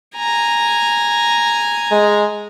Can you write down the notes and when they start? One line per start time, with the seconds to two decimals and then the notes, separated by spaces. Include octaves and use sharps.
0.16 G#5 A#5
1.92 G#3